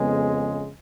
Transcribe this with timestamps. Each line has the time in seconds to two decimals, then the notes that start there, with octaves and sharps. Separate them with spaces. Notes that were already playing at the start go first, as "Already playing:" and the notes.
Already playing: F2 C#3 G#3 B3